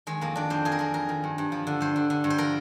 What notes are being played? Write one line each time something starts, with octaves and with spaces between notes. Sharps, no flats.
D#3 G#3
F2 A#3
D#3 D4
F2 C5
F2 G#4
A#4
F2 G#4
F2 A#4
D#3
G2
G2
F3
D3
G2 C5
D3
D3
G2
C5
F3 A#4